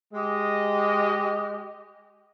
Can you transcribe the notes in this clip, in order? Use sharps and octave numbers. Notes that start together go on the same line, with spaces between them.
G#3 G4 D#5